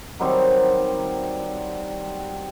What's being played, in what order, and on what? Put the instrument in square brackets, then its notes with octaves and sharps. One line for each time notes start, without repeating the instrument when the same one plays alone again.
[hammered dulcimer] D#3 F#3 G3 C4